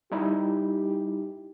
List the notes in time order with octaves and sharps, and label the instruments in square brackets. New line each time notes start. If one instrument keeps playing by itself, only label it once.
[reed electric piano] G3 D#4 E4 [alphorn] G4